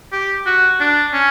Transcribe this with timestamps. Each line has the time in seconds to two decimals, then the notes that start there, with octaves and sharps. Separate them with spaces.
0.12 G4
0.46 F#4
0.80 D4
1.13 C#4